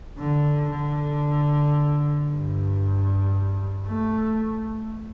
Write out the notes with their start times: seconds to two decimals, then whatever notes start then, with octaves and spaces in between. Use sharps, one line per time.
0.18 D3
0.71 D3
2.29 G2
3.87 A3